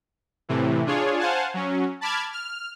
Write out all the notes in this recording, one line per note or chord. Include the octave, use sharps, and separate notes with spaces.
A2 C3 E3
D4 F4 G#4 C#5
C5 F5 F#5 G#5 A5
F#3 C#4
A5 B5 D6 F6 G#6
F6